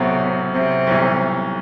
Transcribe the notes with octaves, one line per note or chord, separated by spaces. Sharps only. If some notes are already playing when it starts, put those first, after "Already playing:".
Already playing: B1 A2 C3 F#3 B3
C3
B1 A2 E3 G3